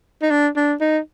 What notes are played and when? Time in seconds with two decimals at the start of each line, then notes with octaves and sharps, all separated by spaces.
0.22 D#4
0.31 D4
0.56 D4
0.81 D#4